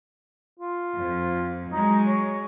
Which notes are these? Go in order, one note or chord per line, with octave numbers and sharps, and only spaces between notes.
F4
F2
F#3 G#3 D#4
C#5